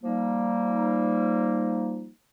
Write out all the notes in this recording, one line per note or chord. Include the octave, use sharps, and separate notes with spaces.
F3 G3 A#3 D#4